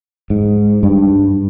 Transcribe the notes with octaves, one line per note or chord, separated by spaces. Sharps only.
G#2
G2